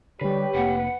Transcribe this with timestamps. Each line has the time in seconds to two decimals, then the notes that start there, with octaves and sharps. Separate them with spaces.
0.21 D3 G3 G4 B4 C#5
0.54 F1 A#3 F#5